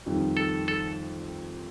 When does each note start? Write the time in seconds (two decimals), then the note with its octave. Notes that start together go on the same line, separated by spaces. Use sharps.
0.06 F2 D#3 G3
0.37 A4
0.68 A4